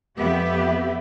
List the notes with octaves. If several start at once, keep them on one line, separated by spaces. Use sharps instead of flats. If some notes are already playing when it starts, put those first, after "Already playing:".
F2 B3 G4 E5